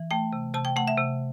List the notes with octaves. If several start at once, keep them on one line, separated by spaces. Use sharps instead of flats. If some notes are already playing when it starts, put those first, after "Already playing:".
Already playing: E3
A3 G5
C3
C3 A5
G5
A3 F#5
E5
C3